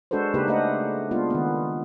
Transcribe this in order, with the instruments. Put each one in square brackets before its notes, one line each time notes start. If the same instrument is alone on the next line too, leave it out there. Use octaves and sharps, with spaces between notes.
[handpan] G#3 D4 F#4 A4 B4 C5
C#3 A#3 D4 D#4 G4 B4
A3 D4 B4 C5 D#5 F#5
G#3 A#3 B3 D4 F4
D#3 B3